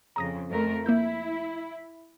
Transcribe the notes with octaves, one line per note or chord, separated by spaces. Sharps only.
F2 C#3 A#5 D#6 A#6
F2 A3 A#4
A#3 E4 E6 G6